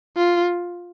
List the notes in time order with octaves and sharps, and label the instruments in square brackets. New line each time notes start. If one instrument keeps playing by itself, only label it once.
[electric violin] F4